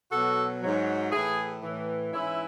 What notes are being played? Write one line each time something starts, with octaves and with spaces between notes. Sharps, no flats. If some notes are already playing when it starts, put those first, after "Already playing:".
B2 F#3 F#4 A4
G#2 F#3
A2 E3 E4 G#4
A2 E3
G#2 E3 C#4 E4